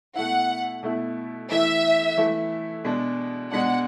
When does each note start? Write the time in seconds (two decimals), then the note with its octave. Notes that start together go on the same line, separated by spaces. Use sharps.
0.15 B2 A3 E4 F#5
0.83 B2 A3 E4
1.50 E3 A3 E4 E5
2.17 E3 A3 E4
2.84 B2 G#3 D4
3.51 B2 G#3 D4 F#5